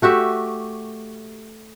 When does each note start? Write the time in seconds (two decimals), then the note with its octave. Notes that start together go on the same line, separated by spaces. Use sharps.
0.02 A3 F#4 G4 E5